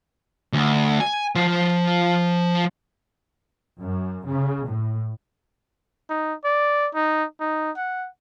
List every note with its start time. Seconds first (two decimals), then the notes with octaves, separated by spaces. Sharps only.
0.53 D2
1.00 G#5
1.35 F3 F4
3.81 F#2
4.26 C#3
4.66 A2
6.09 D#4
6.44 D5
6.94 D#4
7.40 D#4
7.77 F#5